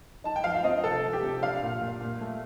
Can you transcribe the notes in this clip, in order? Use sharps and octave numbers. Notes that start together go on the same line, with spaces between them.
D#4 A5
G5
F3 F5
F5
C4 D#5
C2 A4
F3
G4
C3
D4 F5
A#2
A#2
A#2
A3